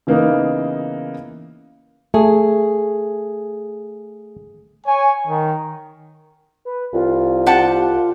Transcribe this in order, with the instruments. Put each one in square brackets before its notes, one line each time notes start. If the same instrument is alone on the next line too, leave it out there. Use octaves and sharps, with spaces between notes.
[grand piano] C#3 E3 A#3 B3 D#4 A#4
[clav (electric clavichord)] A3 [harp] G#4
[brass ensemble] C#5 G#5
D#3
[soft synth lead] B4
[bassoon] C2 [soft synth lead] F4
[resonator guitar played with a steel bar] G4 F#5 A5